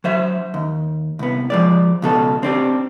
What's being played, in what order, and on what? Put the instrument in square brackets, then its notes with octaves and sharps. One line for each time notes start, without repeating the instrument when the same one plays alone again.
[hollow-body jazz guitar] F#3 C5 E5
D#2
C2 B3
F3 G#3 D5
C#2 B2 A4
C4 D4 G4